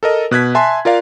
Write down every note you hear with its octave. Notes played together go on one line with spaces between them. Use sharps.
A4 A#4 D#5
B2 F#6 G#6 B6
E5 G#5 A5 C6
F4 A#4 D5 F5